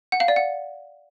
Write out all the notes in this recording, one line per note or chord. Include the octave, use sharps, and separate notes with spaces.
F#5
F5
D5
F#5